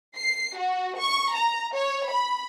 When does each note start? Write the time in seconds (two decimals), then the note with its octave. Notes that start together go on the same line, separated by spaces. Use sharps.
0.17 C7
0.57 F#4
0.99 C#6
1.34 A#5
1.75 C#5
2.10 B5